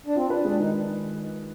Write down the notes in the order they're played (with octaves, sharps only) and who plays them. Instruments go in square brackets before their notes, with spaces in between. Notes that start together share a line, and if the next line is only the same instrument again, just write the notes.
[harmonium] D4
[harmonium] C4 [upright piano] F4
[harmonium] D4 [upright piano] B4
[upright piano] G#3 [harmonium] D4
[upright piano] D#3 [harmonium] D#4